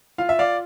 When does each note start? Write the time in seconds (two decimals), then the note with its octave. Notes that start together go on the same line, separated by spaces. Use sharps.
0.18 F4 F5
0.29 E5
0.39 D5 F5